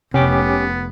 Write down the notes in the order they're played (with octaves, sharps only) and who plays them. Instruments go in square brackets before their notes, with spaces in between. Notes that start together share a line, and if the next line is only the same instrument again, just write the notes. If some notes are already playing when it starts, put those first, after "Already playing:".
[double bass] F1 [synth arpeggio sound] C3 [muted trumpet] B3 [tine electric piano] C#4 G4 D6